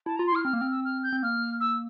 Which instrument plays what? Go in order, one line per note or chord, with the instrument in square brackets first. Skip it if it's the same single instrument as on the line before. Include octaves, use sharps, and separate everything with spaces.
[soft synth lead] E4 [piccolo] A5
[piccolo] A#5
[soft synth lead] F4
[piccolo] C6
[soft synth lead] E4 [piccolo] F6
[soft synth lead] C4 [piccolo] F6
[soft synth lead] A#3
[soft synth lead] C4 [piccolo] F6
[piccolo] E6
F6
G6
[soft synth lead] C4
[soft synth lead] A#3 [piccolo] F6
[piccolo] E6